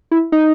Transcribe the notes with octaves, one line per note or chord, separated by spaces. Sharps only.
E4
D#4